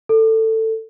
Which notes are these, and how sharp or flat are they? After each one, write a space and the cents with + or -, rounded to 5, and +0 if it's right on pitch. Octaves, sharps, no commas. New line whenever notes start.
A4 +15